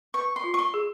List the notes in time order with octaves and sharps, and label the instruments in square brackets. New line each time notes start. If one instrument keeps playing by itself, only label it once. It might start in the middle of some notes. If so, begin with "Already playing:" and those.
[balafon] B4 [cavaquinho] C#6
[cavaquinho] C6
[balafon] F4
[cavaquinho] C#6
C6
[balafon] G#4